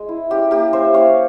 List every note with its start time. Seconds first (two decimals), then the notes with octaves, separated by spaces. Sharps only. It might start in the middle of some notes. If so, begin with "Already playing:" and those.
Already playing: G#3
0.09 E4
0.30 C#4 G4
0.51 A#3 G4 A#4
0.73 C#4 C5 E5
0.94 A#3 C#5 F5